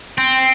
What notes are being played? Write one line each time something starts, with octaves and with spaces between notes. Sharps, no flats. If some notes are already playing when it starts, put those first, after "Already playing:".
C4